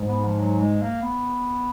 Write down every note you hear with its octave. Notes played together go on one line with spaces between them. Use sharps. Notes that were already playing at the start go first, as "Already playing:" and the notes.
Already playing: G#2
B3
F3
F#3
G#3
A#3
B3